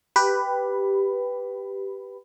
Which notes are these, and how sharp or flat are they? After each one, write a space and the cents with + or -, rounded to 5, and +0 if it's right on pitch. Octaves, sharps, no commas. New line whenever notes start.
G4 +0 B4 +0 B5 +15